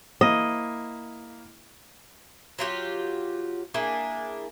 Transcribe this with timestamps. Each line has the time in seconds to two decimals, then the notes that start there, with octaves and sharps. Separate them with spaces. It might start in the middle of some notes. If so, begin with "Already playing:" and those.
0.21 A#3 E4 D#5
2.59 F#3 F4 G4
3.74 A#3 D4 E4 G#4